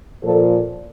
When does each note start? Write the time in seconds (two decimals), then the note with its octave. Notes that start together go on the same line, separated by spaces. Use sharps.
0.21 A#2 F3 A4